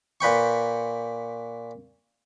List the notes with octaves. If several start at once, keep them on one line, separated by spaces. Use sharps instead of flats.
A#2 B4 G5 C#6